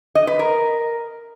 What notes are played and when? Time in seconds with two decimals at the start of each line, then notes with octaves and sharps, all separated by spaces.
0.15 D#5
0.27 B4
0.39 A#4